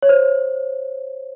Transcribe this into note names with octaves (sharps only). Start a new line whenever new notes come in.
C#5
C5